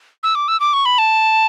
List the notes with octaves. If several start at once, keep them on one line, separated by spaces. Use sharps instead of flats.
E6
D6
E6
D6
C#6
B5
A5